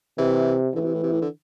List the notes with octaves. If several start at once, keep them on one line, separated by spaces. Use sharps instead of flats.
C3 E3
A2 D3 E3
C3
A2
C3
A2
D3